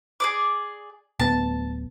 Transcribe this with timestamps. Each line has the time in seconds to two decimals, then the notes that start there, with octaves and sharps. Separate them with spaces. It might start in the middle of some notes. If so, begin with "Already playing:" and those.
0.20 G#4 D5 D6
1.20 D1 B3 A5